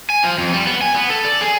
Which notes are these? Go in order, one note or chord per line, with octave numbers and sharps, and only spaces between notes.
G#5
F3
F2
G3
B3
G#5
B3
A4
D5
G#4